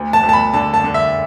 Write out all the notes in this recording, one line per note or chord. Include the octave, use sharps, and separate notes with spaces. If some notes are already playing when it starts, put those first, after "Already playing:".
Already playing: D2
A5
D2
A5
B5
D3 A5
A5
D3
E5